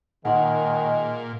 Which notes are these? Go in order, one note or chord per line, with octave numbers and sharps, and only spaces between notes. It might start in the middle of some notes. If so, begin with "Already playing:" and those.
A#2 D#3 G#3 F#5 A#5 C6